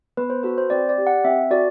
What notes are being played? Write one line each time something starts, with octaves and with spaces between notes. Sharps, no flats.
B3 B4
C5
F#4 A4 B4
C5
C4 D5
D5
G4
F#5
C4 E5
F#4 A4 D5